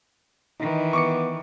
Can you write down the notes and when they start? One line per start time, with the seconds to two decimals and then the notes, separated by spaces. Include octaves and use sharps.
0.60 D#3 E3 D#4
0.93 B3 C#6 D6 C#7